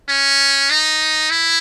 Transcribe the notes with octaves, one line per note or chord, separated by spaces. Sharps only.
C#4
D#4
E4